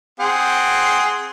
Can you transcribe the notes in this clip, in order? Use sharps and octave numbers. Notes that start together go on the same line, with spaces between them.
C4 G#4 F#5